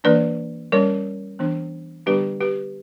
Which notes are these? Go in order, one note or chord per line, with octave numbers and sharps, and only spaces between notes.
E3 A#3 D4 B4 D5
G3 C#4 A#4 C#5
E3 B3 D4
D3 G3 B3 D4 G4 B4
G4 B4